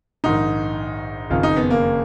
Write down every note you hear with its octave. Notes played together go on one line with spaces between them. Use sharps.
A#1 G#2 D#3 D#4
F#1 F2 D#3 F4
D#4
B3
A#3